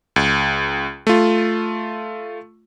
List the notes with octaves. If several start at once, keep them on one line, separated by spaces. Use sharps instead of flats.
C#2
A3 F4